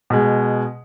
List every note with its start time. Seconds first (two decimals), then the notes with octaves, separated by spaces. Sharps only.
0.10 B2 G#3